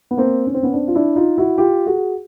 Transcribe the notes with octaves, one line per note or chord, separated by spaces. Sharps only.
B3
A#3 C4
C#4
C4
B3 C#4
C4 D4
F4
D4 E4
D#4 F4
E4 F#4
F4 G4
F#4 G#4